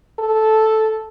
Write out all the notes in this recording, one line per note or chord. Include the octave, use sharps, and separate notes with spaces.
A4